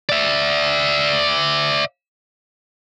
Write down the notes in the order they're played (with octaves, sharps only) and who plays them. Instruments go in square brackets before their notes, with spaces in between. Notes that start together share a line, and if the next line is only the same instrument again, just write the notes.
[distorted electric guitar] D5 E5